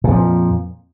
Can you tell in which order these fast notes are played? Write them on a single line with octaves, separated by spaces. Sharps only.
A#2 F2 F3